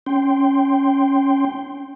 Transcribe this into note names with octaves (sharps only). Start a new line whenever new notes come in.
C#4 G5 C6